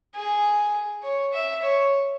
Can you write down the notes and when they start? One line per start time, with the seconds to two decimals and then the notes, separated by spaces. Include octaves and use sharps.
0.15 G#4
1.03 C#5
1.33 E5
1.62 C#5